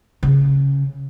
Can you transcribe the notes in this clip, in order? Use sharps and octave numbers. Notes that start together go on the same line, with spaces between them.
C#3